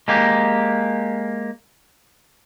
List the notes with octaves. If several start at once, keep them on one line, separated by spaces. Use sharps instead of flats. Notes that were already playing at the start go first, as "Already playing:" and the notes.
G#3 A#3 G4